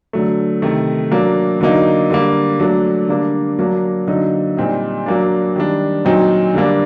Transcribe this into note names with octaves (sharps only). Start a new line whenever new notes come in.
D3 F#3 A3
C3 D#3 A3
F#3 A#3 D4
D3 F#3 A#3 D#4
D3 G3 A#3
F#3 A3 D4
D3 G3 A#3 D4
F#3 A#3 D4
D3 F#3 A#3 D#4
A#2 G3 C4 D#4
F#3 A#3 D4
D#3 G3 D4
A#2 F#3 C4 D#4
D3 G3 A#3 D4